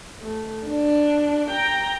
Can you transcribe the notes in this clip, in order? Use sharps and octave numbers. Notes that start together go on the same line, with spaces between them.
A3
D4
G5 A#5